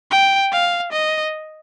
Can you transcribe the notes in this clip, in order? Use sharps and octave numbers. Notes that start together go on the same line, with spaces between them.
G5
F5
D#5